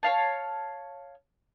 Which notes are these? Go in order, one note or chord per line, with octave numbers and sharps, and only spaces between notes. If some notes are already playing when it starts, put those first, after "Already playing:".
C#5 F5 A5